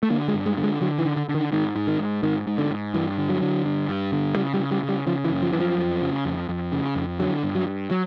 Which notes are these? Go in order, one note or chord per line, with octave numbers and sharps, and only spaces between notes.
A3
D3 A#3
G#3
G2
G#3
D3
G#3
D3 F#3
E3
D3
D3
D3
D#3
G#2 D#3
G#2
D#3
G#2
G#2 D#3
G#2
D3
G#2
G2 E3
D3
F#3
D3
G2
G2
D3
C#3 G3
G3
C#3
G3
C#3
G3
C#3 F3
E3
F#2
F3
F#2 E3
F3
F2
C#3
F2
F2
C#3
F2
D3 F#3
G2
F#3
G2
F#3